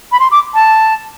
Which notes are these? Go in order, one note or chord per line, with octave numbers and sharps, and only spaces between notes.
B5
C6
D6
A5